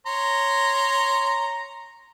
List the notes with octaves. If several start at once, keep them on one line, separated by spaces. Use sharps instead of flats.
C#5 A#5 C6